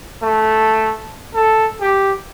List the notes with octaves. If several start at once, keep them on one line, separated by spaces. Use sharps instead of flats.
A3
A4
G4